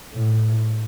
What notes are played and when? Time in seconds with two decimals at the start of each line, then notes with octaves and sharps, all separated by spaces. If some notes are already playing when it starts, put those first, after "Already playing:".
0.13 A2